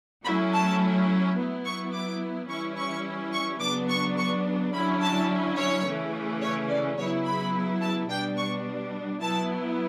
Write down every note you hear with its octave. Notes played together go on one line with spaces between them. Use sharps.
F#3 A3 C#4 E4 B5
A5
F#3 B3 E4
C#6
D6
E3 G3 C#4 E4 C#6
C#6
C#6
C#3 F#3 B3 D4 D6
C#6
C#6
D3 F#3 C#4 E4 B5
A5
C#5
C#3 E3 A3 C#4
C#5
D5
C#3 F#3 B3 E4 C#5
B5
A5
B2 G3 B3 D4 G5
C#6
F#3 B3 E4 A5